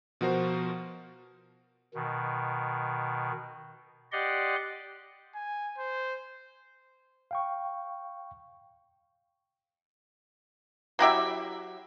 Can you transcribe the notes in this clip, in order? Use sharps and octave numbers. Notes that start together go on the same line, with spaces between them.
B2 F3 F#4 A#4 C5
B2 D#3
G4 D5 D#5 F#5 C6
G#5
C5
F5 G5 C#6
F#3 E4 G4 E5